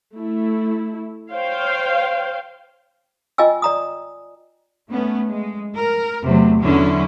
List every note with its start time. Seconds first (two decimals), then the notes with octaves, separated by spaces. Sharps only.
0.16 A3 E4
1.32 C5 C#5 F5 G5
3.38 F4 D#5 G5 G#5 E6
3.62 D5 A#5 D#6
4.90 A3 B3 C#4
5.30 G#3
5.75 A#4
6.23 E2 C3 F#3 A3
6.61 E2 D3 F#3 C#4 E4